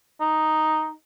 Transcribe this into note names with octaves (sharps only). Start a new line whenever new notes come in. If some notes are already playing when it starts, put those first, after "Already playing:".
D#4